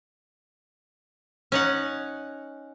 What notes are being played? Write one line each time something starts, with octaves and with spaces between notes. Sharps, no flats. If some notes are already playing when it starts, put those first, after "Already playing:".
C#4 D#4 F#5